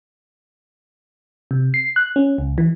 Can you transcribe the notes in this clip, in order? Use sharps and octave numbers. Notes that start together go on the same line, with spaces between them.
C3
C7
F#6
C#4
C#2
E3